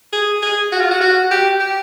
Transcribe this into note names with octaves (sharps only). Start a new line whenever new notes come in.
G#4
G#4
F#4
F4
F#4
F#4
G4
G4